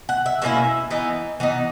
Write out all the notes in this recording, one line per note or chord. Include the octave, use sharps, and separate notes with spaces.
F#5
E5
B2 A#3 C#4 E4 E5
E3 B3 D#4
E3 B3 D#4